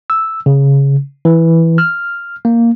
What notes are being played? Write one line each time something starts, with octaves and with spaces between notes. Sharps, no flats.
E6
C#3
E3
F6
A#3